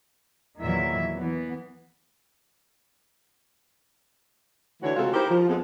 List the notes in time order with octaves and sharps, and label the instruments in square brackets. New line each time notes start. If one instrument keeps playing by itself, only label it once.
[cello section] E2 A#2 D#3 E3 F#3 E5
E3 B3
[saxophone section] D3 E3 A3 F#4 C#5
C3 G#3 A3 F4 F#4 A4
D#4 E4 G4 A#4 C5
F3
F2 G#3 B3